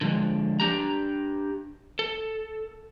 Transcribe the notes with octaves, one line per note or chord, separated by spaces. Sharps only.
D3 F3 G#3
D4 G4 A#5
A4